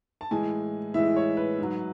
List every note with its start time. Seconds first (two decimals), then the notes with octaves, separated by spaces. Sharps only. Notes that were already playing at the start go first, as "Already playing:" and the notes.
0.21 A5
0.31 A2 E3 G#3 G#5
0.94 A2 E3 G#3 E5
1.17 C#5
1.37 B4
1.59 G#2 F#3